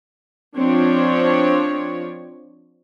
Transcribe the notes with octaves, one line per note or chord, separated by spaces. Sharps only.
F3 C4 D4 C#5